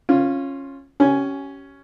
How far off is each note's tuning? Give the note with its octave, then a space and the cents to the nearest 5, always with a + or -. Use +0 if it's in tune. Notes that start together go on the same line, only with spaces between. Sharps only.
C#4 -15 F4 +0
C#4 +5 G4 -35 G#5 +0